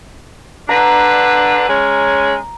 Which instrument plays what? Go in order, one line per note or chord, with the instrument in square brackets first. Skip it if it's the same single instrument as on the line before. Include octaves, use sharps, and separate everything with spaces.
[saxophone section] D3 D4 B4 [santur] A#5
[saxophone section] G#3 C#4